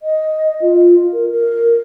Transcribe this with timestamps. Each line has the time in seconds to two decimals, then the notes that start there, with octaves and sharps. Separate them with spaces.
0.01 D#5
0.62 F4
1.13 A#4
1.32 A#4